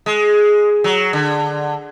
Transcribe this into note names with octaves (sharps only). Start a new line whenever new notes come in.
G#3
F#3
D3